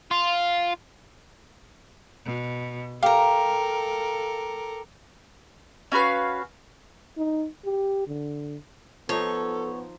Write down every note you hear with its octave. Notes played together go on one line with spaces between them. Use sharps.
F4
B2
G4 A4 A#4 F5 A#5
C#4 F#4 B4 F5
D#4
G4
D3
F3 B3 D#4 A4 C#5